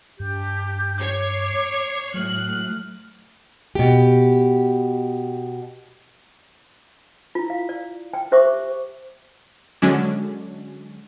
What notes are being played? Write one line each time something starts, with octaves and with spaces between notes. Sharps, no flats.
G2 D4 G4 G6
C#5 D6 G#6 C7
A2 F#3 F6 F#6
B2 G4
E4 F4
F5
D5
G5
G4 C5 E5 C#6 D6
D3 F#3 G#3 C#4 D4